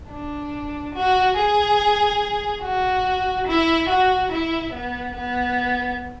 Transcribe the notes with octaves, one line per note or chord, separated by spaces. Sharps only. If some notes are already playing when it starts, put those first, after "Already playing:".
D4
F#4
G#4
F#4
E4
F#4
E4
B3
B3